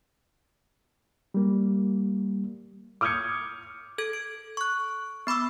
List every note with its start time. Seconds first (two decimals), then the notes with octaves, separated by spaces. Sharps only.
1.34 G3 A#3
3.01 D6 D#6 F6 G6 G#6 C#7
3.98 A4 G#6 D7
4.13 D7
4.57 C#6 F#6
5.27 B3 B5 D6 E6